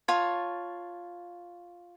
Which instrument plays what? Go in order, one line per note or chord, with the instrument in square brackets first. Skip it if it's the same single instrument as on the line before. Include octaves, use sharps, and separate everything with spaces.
[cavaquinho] F4 C#5 A5